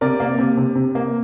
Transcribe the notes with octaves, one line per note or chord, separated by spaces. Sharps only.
C3 A#4 D5
A#3
C3
C3
C3
A#3